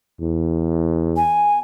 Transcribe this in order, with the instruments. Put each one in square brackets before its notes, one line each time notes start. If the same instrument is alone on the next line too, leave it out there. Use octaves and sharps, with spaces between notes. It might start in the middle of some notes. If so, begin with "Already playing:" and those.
[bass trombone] E2
[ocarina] G#5